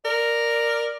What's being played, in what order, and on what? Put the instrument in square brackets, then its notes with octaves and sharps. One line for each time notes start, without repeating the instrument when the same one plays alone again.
[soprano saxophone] A#4 [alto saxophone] D5